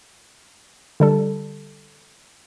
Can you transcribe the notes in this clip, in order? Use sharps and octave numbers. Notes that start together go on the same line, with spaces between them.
D3 G3 A4